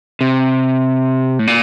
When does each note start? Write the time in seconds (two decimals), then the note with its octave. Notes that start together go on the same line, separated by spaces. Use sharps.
0.21 C3
1.39 A2
1.47 A#2